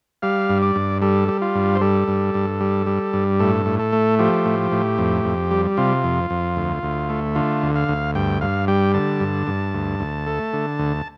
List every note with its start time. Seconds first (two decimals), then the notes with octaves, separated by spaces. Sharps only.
0.22 G3 F5
0.49 G2
0.62 D5
0.76 G2
1.02 G3 A4
1.28 G3
1.42 F4
1.55 G2
1.75 C5
1.81 G3 A4
2.08 G2
2.34 G2
2.60 G3
2.87 G3
3.13 G2
3.40 A2 A4
3.66 A2
3.79 A4
3.93 A3
4.19 F3 G4
4.45 A2
4.72 A2
4.98 F2
5.25 F2
5.51 G3
5.77 C3 F4
6.04 F2
6.30 F2
6.57 D2
6.83 D2
7.10 A3
7.35 D3 F4
7.62 D2
7.75 F5
7.88 D2
8.15 G2 G5
8.41 G2 F5
8.68 G3 G5
8.94 D3 A5
9.20 G2
9.47 G2
9.74 D2
10.00 D2
10.26 A3
10.53 D3
10.79 D2